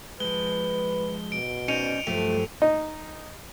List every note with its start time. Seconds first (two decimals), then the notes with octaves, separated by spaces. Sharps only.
0.20 F3 G#3 B4 G7
1.32 B2 D7
1.68 C#4 D#4 C5 D5 C#7 D#7 F7
2.07 G2 F3 F#3 A3 G4
2.62 D#4